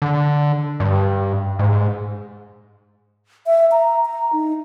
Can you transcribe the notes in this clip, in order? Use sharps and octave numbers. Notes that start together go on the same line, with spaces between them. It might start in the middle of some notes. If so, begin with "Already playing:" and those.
D3
G2
G#2
E5
A#5
A#5
D#4